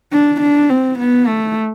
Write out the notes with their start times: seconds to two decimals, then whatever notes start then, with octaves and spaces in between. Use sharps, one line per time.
0.13 D4
0.42 D4
0.70 C4
0.99 B3
1.27 A3